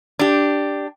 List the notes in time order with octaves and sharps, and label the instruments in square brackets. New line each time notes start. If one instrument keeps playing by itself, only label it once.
[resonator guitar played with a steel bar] D4 G4